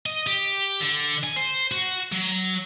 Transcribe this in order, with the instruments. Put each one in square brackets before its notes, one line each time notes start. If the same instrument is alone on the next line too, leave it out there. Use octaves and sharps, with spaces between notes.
[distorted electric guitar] D#5
G4
D3
G#5
C5
F#4
F#3